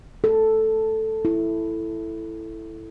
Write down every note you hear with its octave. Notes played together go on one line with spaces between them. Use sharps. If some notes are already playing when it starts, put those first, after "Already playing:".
A4
E4